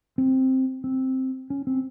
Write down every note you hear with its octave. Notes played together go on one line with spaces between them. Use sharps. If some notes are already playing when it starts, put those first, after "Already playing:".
C4
C4
C#4
C4